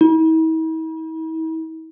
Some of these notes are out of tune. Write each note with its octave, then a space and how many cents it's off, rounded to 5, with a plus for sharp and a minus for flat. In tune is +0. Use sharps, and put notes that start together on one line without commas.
E4 -45